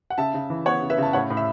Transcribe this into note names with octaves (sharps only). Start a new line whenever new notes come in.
F#5
C#3 E5 A5
C#3
E3
B3 C#5 F#5
C#3
B4 E5
C#3 A5
A2 C#5 F#5
A2
E5